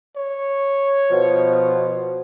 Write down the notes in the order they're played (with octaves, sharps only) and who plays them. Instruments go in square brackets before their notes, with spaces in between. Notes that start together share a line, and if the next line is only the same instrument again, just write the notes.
[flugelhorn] C#5
[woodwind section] B2 F3